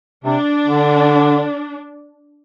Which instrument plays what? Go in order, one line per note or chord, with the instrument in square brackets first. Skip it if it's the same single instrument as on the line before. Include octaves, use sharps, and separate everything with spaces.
[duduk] C3 [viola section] D4
[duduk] D3